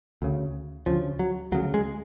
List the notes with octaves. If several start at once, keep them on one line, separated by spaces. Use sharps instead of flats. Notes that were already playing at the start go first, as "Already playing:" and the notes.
D2 C#3
D2 C#3 F3
F#3
D2 C#3 F#3
G#3